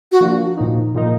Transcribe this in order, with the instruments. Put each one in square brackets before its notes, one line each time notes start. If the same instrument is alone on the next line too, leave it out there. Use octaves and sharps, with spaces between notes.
[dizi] F#4
[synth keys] F3 A#3 D4 F4
A#2 F3 A#3 D#4
A#2 F3 A#3 D#4